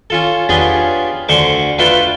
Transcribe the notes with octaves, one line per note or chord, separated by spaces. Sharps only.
C#4 F4 A4
B3 C#4 D4 F4 G4 G#4
D2 D3 C5 C#6 D6
A3 D4 F4 A4 B4 G5